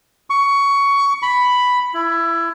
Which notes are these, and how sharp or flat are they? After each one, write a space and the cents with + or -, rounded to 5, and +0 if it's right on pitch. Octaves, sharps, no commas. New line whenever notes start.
C#6 +15
B5 +5
E4 +25